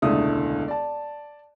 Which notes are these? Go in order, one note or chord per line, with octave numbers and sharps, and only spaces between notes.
E1 C#2 D3 A3 E4 D#6
D5 A5